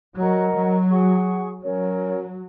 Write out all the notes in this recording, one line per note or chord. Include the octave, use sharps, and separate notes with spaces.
F#3 A#4 D#5 F#5 A#5
F#3
G#4 F#5 C#6
F#3 C#4 A#4 C#5